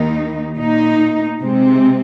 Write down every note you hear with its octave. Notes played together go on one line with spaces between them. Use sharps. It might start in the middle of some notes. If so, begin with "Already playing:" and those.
Already playing: D#2 D#3 A#3 D#4
A#2 A#3 D#4
C3 G#3 C4